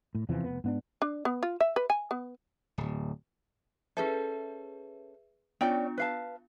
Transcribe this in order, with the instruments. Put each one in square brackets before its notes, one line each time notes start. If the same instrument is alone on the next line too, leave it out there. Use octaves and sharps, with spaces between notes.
[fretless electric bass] A2
E2 C3 E3 F3
F1 B3
G#2 B3 D4
[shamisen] D4
B3
F4
E5
B4
G#5
B3
[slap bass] D1
[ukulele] C#4 D#4 A4 [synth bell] G#4 B4 E5
[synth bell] B3 D4 F4 [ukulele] C#4 D5 G5
[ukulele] B4 F5 A5